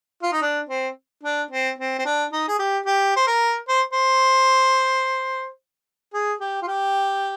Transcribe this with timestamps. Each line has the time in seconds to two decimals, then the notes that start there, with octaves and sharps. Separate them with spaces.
0.23 F4
0.32 D#4
0.42 D4
0.69 C4
1.23 D4
1.51 C4
1.78 C4
1.99 C4
2.05 D4
2.32 D#4
2.48 G#4
2.59 G4
2.86 G4
3.16 C5
3.27 A#4
3.68 C5
3.93 C5
6.14 G#4
6.41 G4
6.62 F4
6.67 G4